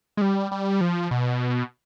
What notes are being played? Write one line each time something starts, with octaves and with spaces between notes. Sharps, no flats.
G#3
G3
G3
F3
B2